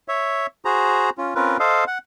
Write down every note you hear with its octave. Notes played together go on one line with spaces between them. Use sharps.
C#5 E5
F#4 G#4 C5 A#5
C#4 F4
C4 C#4 F4 A#4 B4
A4 C5 D#5 F5
F#5